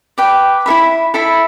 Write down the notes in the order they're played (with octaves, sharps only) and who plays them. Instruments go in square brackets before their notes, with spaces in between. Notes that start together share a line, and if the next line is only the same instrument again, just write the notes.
[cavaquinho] B4 D5 G5
E4 A4 E5 B5
E4 A4 E5 B5